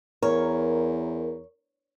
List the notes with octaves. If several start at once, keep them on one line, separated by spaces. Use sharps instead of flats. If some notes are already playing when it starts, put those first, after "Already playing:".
E2 A#4 C#5